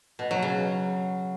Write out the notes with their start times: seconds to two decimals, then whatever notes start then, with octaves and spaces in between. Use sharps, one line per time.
0.19 B2
0.31 F#3
0.43 C#3